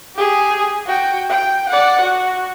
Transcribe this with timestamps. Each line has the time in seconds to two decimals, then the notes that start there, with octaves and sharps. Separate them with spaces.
0.16 G4 G#4
0.86 F#4 G5
1.29 G5
1.69 D5 F#5
2.01 F#4